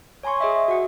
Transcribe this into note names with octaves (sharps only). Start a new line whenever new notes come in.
C#5 G#5 A#5 C6 C#6
G#4 D#5 E5
F#4 F#5